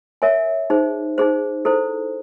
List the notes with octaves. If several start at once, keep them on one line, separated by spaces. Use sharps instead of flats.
A#4 C#5 E5 G#5
D#4 G#4 C5
D#4 G#4 C5
E4 A4 C5